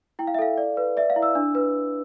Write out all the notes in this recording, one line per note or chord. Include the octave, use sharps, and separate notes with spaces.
E4 G5
F5
E5
A4 F5
D5
B4
D5 E5
F5
E4
E6
D4
B4